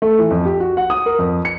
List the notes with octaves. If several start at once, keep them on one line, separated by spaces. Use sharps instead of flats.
A3
E3
F2
G4
F#4
F#5
D#6
A#4
F2
C#7